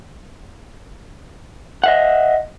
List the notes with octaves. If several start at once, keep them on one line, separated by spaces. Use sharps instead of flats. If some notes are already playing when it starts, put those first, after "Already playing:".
D#5 E5 F#5